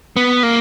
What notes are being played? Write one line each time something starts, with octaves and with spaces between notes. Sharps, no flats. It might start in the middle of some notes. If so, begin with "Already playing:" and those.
B3
A#3